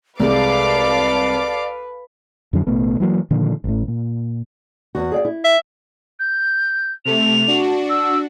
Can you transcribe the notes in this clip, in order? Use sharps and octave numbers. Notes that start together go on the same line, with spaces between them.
C2 G#3 A4 B4 D5 F5 D6
F2 D3 F#3 D4
A1 B2 A3 B3
E3 F#3 A#3
A#2 D3 D#3 F3
A1 A2
A#2
E2 F#4
G#4 D5 F5
E4
E5
G6
C3 A3 F7
D4 F#4
E6